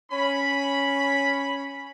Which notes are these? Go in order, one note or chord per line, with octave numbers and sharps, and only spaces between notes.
C#4 B5